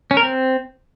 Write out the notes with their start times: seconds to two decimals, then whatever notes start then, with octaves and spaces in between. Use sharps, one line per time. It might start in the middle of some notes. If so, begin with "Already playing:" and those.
0.11 C#4
0.17 A#4
0.23 C4